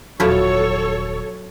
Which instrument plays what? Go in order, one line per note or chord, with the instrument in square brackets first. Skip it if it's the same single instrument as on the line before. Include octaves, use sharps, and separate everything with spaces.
[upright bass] D#1 G#1 [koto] F3 A3 E4 [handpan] F#3 [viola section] A4 C#5